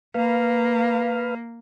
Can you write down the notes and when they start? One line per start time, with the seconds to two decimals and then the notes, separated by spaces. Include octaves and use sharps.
0.14 A#3 B4 F5